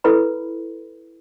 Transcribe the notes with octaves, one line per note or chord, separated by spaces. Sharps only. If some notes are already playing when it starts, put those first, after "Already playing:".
E4 A4 B4 B5